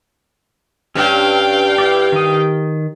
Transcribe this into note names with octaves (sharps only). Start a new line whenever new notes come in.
G2 C#4 D4 F5 G5
E4 G4 D5
D#3 D#6